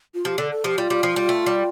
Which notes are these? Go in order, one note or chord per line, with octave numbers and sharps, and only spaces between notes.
F4
F3 G4
D3 A4
A4
F3 G4
G3 F4
G3
F3
G3
A3
G3